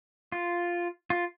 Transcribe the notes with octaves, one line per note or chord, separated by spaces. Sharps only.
F4
F4